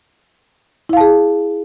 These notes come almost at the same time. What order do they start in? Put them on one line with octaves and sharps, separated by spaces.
E4 F5 A5 G#4